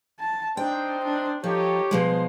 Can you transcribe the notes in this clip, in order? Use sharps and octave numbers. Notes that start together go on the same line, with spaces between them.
A5
C4 D4 D#4 C5 G5
D4
F3 D#4 G4 A4 C#5
B2 F3 G#3 C5